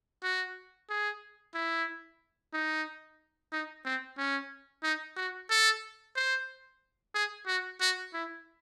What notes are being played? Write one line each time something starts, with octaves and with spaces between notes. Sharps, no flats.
F#4
G#4
E4
D#4
D#4
C4
C#4
D#4
F#4
A4
C5
G#4
F#4
F#4
E4